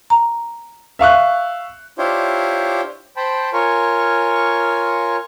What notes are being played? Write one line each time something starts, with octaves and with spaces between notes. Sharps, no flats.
A#5
E5 F5 C#6 F#6
D4 E4 F4 G4 C5 C#5
C5 G5 A5 B5
F4 A#4 C#5 G#5 C#6